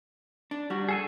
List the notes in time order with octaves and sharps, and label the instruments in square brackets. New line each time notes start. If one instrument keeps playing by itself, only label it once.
[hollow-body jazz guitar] D4
G3 F#4
[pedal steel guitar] G#4 A4 G#5